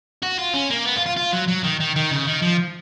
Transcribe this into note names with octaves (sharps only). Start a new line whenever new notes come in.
F#4
F4
C#4
A#3
B3
F4
F4
F4
F#3
F#3
D#3
D#3
D#3
C#3
D#3
F3